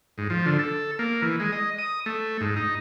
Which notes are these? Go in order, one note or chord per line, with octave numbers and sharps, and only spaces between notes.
G#2
F3
D3
A4
A#3
E3
G#3
D#5
D#6
A3
G#2
D#4